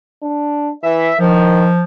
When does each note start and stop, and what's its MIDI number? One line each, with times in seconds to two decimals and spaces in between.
0.23 0.72 62
0.83 1.11 52
0.83 1.17 76
1.20 1.70 51
1.20 1.82 53